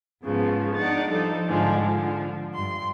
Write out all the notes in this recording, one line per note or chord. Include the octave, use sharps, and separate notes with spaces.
G#2 C#3 F3 B3
D4 D#4 F#5 A6
F3 G3 D#4 A4
G#2 D3 F3 G#3 D4
D3 F3
G2 C6